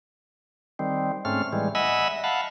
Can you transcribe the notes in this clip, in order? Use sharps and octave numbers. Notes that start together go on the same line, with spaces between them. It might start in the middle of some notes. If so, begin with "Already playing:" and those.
D#3 G3 C4
G#2 A3 C4 C#4 F6
A2 E3 G3 G#3
D#5 E5 F#5 G#5 B5 E6
F5 F#5 A5 B5